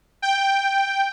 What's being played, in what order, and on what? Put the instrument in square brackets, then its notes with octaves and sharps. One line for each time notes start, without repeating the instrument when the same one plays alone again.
[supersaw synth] G5